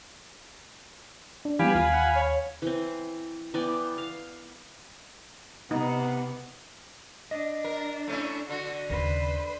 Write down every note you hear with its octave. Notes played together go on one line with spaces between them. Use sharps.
D4
E3 G3 B3 G4 F5 G#5 B5
D#2 F4
F#5
C#5
E3 C4
E3 B3 D5 G5
F5
C3 B3 D#4
D4 D#5
A#4
A3 C#4 E4
D3 F#4
D#2 C#3 B4 C5